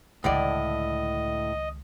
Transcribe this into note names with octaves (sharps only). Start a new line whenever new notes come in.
C#2 A2 D3 D#3 D5 D#5